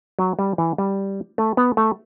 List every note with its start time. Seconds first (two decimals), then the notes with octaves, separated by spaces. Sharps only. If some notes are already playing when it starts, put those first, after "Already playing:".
0.19 F#3
0.39 G3
0.58 E3
0.78 G3
1.38 A3
1.57 B3
1.77 A3